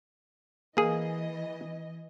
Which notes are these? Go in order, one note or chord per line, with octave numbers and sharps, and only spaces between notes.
E3 A#3 G#4 D#5